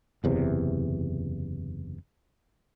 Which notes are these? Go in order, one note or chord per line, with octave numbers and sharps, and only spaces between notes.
F#1 E2 C3